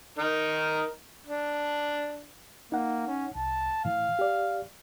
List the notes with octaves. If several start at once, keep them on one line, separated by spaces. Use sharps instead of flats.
D#4 A#4
D4
A#3 D#4 F#5
C#4
C2 A5
A2 E3 F5
G4 D5